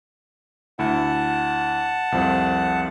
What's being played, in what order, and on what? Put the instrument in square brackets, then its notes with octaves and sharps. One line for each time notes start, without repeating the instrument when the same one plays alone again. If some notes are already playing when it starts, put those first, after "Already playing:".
[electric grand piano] D2 E4 [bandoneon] F#5 A5
[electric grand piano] C2 F2 F3